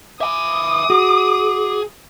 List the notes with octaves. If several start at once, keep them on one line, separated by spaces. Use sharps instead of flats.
E5 G#5 D6 D#6
F#4 G#4